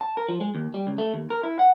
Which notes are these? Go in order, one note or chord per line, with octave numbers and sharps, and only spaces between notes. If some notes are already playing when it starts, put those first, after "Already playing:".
A5
A#4
F3
G#3
D#2
G3
C#2
A3
D#2
A#4
E4
F#5